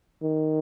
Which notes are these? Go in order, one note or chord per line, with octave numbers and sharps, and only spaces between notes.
D#3